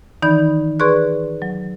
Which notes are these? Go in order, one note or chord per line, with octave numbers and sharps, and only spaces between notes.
D#3 E3 D#4 D5 B5 G6
G#4 B4 D5 C6 C#6 F#6
F#3